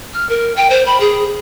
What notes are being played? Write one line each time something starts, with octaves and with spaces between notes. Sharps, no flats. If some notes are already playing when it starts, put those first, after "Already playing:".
F6
A#4
G5
C5
B5
G#4